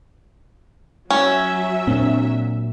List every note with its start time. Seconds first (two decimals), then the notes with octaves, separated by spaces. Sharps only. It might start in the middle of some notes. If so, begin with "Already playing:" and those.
1.11 F#3 C#4 E5
1.87 A#2 C4 D4